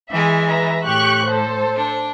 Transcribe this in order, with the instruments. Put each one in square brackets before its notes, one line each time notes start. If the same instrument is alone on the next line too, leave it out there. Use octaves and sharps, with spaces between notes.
[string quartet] E3 G#3 [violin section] E5
[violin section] B4 E5 A#5
[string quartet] A2 [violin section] G4 C#6 F#6
[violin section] A4 C5
[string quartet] D4